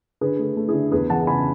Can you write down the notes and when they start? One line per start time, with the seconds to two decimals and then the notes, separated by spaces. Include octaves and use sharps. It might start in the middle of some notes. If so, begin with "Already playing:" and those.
0.21 D3 G#4 B4
0.39 A3
0.57 A3
0.68 E4 G#4
0.74 D3
0.92 E2 G#4 B4
1.10 E3 F#5 A5
1.27 C#3 G#5 B5